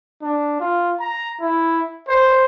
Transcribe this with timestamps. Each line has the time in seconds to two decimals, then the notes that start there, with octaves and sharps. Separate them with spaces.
0.22 D4
0.60 F4
1.00 A#5
1.41 E4
2.08 C5